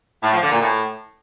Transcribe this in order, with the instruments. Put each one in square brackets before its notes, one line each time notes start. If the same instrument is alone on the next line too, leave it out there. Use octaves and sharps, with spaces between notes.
[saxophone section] A2
F3
D3
A#2
A2